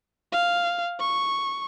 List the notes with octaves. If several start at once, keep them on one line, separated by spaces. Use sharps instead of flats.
F5
C#6